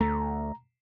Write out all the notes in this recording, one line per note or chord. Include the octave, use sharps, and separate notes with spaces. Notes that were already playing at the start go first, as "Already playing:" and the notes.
D2 A3 A#5